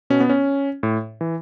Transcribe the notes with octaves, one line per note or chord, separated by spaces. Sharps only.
B2 C#4
B3
C#4
A2
E3